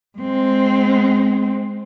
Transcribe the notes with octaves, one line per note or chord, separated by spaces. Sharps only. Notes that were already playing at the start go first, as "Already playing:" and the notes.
G#3 C4